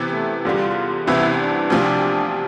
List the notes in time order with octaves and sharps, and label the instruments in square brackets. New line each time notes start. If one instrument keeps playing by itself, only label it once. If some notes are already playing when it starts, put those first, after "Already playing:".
Already playing: [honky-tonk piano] C3 E3 B3
[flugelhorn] A3
[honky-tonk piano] E2 D3 G3 [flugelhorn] F4
[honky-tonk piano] C2 C3 E3 B3 [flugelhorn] E4
[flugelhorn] D4
[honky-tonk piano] D2 C3 F3